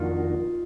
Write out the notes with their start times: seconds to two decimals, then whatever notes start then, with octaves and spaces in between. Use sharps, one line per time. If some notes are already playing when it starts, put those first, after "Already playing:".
Already playing: F2 D#3 A#3 D4 D#4 F4 F#4